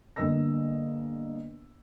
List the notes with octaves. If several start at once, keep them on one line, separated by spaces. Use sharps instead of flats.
G1 D3 A#3 D#5 E6 A#6